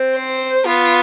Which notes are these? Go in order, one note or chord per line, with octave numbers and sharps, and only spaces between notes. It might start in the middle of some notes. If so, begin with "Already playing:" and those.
Already playing: C4
C5
B3 F4